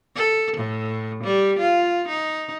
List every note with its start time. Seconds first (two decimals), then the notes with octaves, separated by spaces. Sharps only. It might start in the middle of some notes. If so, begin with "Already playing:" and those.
0.16 A4
0.57 A2
1.23 G3
1.59 F4
2.08 D#4